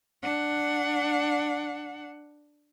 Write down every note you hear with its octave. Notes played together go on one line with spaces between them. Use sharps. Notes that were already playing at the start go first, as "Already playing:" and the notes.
D4 F#5